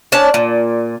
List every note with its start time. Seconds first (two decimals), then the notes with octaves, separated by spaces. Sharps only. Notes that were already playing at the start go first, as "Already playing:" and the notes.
0.12 C#4 D4 A5
0.34 A#2